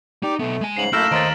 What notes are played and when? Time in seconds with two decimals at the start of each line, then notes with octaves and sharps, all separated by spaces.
0.23 D#4 G4 D5
0.39 B1 A3 B3
0.61 G#3 G#5
0.77 G#2 C#3 C7 F#7
0.93 F#2 A3 A#3 E4 F6 G6 A#6 E7
1.12 D#2 A#4 C5 C#5 D#5 A6 B6 D7